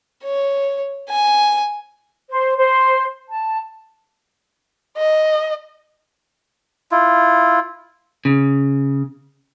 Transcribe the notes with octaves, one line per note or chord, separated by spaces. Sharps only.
C#5
G#5
C5
C5
A5
D#5
E4 F4
C#3